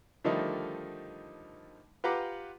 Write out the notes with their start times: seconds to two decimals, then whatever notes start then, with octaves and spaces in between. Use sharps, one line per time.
0.24 D3 D#3 F3 G3 A3 D#4
2.04 F4 G4 B4 F#5 A#5 D6